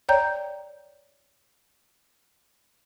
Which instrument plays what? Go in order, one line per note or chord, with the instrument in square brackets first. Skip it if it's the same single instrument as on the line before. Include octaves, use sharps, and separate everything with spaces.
[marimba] C#5 D5 G5 A#5 G6